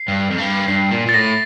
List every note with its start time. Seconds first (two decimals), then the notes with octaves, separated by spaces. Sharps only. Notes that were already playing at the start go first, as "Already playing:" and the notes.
Already playing: C7
0.08 G2
0.30 F2
0.38 G2
0.68 G2 C7
0.91 A#2
1.07 A#2 A6
1.14 A2 A#6